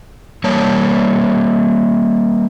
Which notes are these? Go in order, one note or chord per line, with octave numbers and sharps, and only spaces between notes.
G3 A#3 C#5 A5